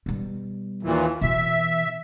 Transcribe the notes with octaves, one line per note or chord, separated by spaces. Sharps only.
B2 G3
D#2 A#2 E3
B2 E3 E5